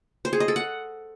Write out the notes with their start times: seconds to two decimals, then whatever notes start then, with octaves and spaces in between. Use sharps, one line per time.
0.25 C5
0.33 G#4
0.40 D#5
0.48 A4
0.56 F#5